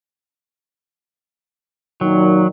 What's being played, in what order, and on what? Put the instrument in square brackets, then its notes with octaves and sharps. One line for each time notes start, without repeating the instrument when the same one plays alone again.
[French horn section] A#2 D#3 D#4 [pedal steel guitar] F#3